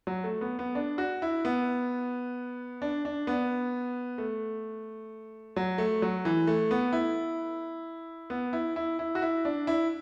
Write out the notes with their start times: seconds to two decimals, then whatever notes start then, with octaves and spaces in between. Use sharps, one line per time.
0.07 F#3
0.24 A3
0.41 B3
0.59 B3
0.75 D4
0.98 F#4
1.22 E4
1.45 B3
2.82 D4
3.05 D4
3.27 B3
4.18 A3
5.56 F#3
5.78 A3
6.02 F#3
6.25 E3
6.47 A3
6.71 B3
6.93 E4
8.30 B3
8.53 E4
8.76 E4
8.99 E4
9.15 F#4
9.22 E4
9.45 D4
9.67 E4